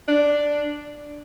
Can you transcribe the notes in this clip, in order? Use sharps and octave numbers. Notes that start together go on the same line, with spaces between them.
D4